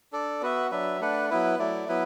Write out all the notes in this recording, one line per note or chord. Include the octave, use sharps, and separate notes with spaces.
D4 A4 D5
B3 F#4 B4 E5
F#3 D4 B4 E5
A3 D4 B4 F#5
F#3 B3 E4 B4
F#3 A3 E4 D5
F#3 B3 E4 B4